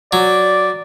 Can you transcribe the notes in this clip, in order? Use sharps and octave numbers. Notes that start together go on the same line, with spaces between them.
F#3 D5